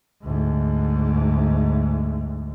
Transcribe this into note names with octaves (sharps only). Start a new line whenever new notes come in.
D2 G#2